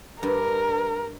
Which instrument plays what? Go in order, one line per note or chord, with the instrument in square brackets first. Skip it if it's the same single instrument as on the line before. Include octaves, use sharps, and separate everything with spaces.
[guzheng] G2 [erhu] A#4